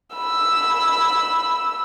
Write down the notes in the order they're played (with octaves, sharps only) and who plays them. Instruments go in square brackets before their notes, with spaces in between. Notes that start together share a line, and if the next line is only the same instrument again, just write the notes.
[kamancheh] B5 E6